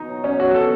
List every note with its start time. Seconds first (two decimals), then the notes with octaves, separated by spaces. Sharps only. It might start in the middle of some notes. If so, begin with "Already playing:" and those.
Already playing: B2 D#4
0.08 F#3
0.24 F#3 C#4
0.39 B2 F#4
0.54 B2 A4